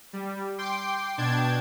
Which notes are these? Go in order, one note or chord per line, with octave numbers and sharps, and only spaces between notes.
G3
G5 C6 D6
B2 D4 G5 A5 G#6